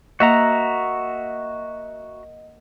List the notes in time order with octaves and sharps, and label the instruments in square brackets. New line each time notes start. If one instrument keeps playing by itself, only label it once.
[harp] A#3 F#5 [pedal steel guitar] F#4 E5 A#5 [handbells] D#5